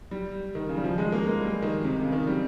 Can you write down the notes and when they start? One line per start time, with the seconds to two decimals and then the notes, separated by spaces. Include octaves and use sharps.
0.11 G3
0.55 D#3
0.69 C#3
0.77 G3
0.84 F3
0.98 G#3
1.12 A#3
1.26 A#3
1.41 G3
1.62 D#3
1.84 C3
1.99 C#3
2.12 D#3
2.27 G3